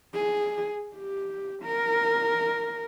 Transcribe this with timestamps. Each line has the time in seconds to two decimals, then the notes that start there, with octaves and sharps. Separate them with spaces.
0.14 G#4
0.96 G4
1.63 A#4